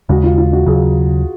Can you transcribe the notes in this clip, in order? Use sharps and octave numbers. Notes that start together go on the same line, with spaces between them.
D#2 C#3 G#3 F#4
F4
F4
F#4
D#2 C#3 F#3 G#4